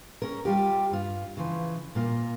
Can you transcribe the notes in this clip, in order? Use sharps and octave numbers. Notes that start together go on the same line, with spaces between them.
C#4 G#4 A#4
G3 F4 G4
G2 F4
C#3 E3 F3
A#2 A#3 F4